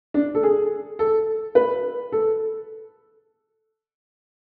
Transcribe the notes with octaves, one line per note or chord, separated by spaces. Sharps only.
D4
A4
G#4
A4
B4
A4